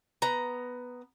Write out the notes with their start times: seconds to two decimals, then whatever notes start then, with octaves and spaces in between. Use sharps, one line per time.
0.22 B3 A#5